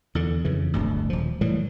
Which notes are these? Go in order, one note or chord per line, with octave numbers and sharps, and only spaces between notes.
E2 D3
F2 C#3 E3
D1 G1 D2
D#1 F3
A2 E3 F#3 G3